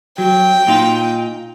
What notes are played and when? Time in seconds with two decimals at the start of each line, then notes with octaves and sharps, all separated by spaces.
0.18 F#3 G5
0.67 A#2 D#4 F4